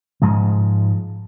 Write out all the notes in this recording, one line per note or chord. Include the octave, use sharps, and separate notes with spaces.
G#2 F3 G#3